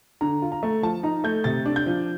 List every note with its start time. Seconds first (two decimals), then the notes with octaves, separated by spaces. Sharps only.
0.21 D3 A#5
0.42 F4
0.52 A#5
0.63 A3
0.83 F3 A5
1.03 D#4 A#5
1.24 A3 G6
1.44 C3 A6
1.66 D4
1.76 G6
1.86 F3